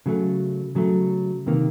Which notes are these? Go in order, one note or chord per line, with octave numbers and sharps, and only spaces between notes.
C#3 F#3 A3
C#3 F#3 A3
C3 D#3 A#3